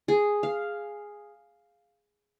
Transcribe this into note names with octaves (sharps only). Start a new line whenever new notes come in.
G#4
F5